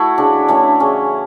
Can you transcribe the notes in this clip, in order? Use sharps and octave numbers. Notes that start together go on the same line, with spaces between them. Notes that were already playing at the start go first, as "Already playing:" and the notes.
Already playing: A3 E4 F#4
C#3 D4
E3 A3 C#4 D4
C#3 C#4